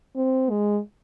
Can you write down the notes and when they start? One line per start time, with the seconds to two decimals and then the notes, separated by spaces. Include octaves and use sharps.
0.16 C4
0.50 G#3